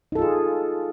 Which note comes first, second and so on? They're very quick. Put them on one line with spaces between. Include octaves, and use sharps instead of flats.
D#4 A4 F4 G#4